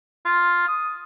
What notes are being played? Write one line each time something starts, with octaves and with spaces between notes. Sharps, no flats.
F4
D#6